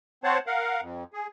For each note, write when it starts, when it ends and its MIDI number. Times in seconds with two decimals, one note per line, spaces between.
0.24 0.38 60
0.24 0.38 72
0.24 0.38 73
0.24 0.38 78
0.24 0.38 81
0.47 0.81 70
0.47 0.81 77
0.47 0.81 78
0.81 1.04 41
1.13 1.27 68